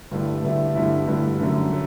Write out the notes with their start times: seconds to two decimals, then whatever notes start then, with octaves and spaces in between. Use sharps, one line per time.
0.11 G2 D3 A3 E4
0.43 G2 D3 A3 E4
0.74 G2 D3 A3 E4
1.07 G2 D3 A3 E4
1.39 F#2 D3 A3 C#4
1.70 A3 C#4